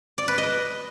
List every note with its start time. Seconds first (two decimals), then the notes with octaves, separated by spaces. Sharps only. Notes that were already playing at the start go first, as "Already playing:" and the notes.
0.18 D5
0.28 B4
0.38 D#5